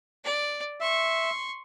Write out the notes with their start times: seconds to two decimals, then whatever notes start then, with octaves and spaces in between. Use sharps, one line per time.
0.24 D5
0.80 E5 C6 C#6